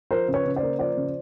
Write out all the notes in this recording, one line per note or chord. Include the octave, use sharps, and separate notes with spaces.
F3 A#4 C5
C#3
B4 C#5
C#3
C5 D5
A#3
F3 C5 D5
C#3